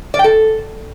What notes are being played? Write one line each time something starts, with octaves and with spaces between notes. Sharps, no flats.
D5
G5
A4